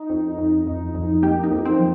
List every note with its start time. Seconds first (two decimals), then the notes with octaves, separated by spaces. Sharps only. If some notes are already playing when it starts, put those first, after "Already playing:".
Already playing: D#4
0.10 F2
0.38 F2
0.67 F2
0.95 F2
1.23 A#3 G4
1.43 D#4
1.51 F2
1.65 C4
1.79 F3